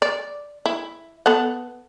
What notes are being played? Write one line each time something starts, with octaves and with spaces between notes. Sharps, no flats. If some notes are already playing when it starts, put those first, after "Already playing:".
D5
E4
B3 A4 F#5